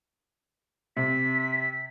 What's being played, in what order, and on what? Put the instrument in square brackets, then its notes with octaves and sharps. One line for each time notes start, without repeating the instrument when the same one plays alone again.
[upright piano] C3 [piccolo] B6